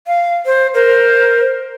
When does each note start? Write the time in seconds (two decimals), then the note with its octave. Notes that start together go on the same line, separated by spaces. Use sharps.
0.07 F5
0.46 C5
0.74 A#4 C5